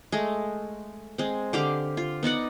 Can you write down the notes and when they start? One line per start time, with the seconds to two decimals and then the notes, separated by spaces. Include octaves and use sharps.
0.12 G#3 A3
1.18 G#3 C4
1.53 D3 G4 F5 D6
1.97 F4
2.23 B3 D#4 D5 F#5